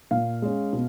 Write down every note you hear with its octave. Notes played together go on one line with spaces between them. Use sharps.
A#2 F5
G#3 C#4
B2